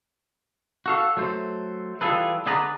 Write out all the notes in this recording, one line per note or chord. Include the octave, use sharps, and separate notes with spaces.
F#4 A4 F5
F#3 A3 C5
E3 G3 F4 G#4 A4 B4
D3 D4 G#4 B4 D5 A#5